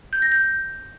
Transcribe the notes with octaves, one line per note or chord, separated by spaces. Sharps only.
G6
A#6
G6